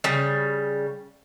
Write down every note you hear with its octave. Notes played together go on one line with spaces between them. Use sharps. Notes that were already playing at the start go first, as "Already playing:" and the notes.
C#3 G3